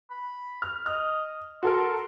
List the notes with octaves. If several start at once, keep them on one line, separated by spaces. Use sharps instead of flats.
B5
F6
D#5 F6
F#4 A4 A#4 C6